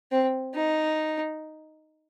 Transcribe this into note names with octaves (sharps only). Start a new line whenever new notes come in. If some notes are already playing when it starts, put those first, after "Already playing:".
C4
D#4